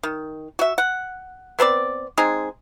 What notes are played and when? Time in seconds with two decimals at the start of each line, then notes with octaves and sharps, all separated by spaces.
0.03 D#3
0.59 F#4 E5
0.78 F#5
1.59 B3 C4 A#4 D5
2.18 G#3 C4 D#4 G#4